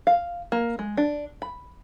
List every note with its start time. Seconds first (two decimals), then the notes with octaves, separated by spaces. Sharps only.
0.07 F5
0.52 A#3
0.79 G#3
0.97 D4
1.42 B5